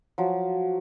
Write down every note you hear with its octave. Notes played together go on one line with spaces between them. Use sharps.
F3 F#3